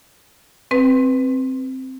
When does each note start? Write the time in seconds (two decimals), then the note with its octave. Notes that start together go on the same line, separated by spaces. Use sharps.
0.71 C4 B4